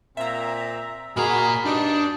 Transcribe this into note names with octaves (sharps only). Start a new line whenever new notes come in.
A#2 C4 E5 A#5
A#2 F#4 G#4 A#4 D#5 A#5 B5
G2 D4 D#4 D5